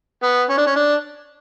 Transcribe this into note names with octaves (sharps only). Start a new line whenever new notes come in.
B3
C#4
D4
C#4
D4